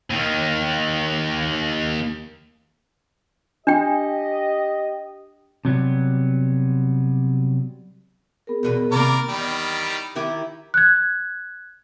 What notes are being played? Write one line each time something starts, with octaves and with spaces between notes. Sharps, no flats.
D#2 D#3
D4 G4 D#5 G5
C3 F#3 G3 B3
B3 G#4 A#4
E2 B2 B4
C3 D#3 A#3 A#4 D5 B5
E2 D#3 G3
D#3 E4 G4
F#6 G#6